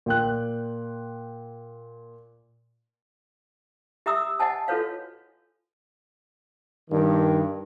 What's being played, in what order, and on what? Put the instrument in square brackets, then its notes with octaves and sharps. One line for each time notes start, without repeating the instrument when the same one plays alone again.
[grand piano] A#2 G5 F#6
[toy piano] G4 E5 A#5 D#6 E6
D#5 F#5 G#5 A5
F4 F#4 A4 B4 C#5 F5
[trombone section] G2 D#3